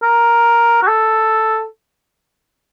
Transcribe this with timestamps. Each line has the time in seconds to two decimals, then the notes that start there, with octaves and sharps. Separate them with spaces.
0.02 A#4
0.83 F#4
0.88 A4